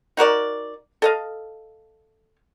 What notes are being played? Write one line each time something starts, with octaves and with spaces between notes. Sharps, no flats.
D#4 F#4 A#4 D5
A4 D#5 F5